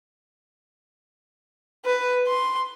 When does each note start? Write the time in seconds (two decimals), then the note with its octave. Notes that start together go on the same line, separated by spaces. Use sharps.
1.86 B4
2.27 C6